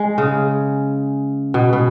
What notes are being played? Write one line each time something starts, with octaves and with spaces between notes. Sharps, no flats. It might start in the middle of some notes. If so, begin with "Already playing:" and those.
Already playing: G#3
C#3
B2
B2